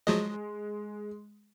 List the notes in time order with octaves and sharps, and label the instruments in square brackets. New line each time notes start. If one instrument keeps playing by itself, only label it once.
[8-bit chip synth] F3 F#3 D#5 [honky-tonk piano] G#3